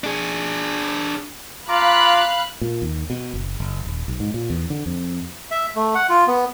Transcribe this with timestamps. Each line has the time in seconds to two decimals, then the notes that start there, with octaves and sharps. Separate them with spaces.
0.04 D4 G#4
1.69 F4 F5 A#5 B5 D6 F#6
2.61 A#2
2.82 D#2
3.10 B2
3.34 F#1
3.60 F#1
3.85 D#1
4.08 B1
4.20 G#2
4.34 A#2
4.50 E2
4.70 D3
4.86 F2
5.51 E5
5.76 A3
5.95 F#5
6.09 F4
6.27 B3